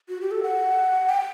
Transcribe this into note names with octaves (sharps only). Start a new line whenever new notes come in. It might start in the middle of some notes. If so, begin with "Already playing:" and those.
F#4
G4
A4
F#5
G5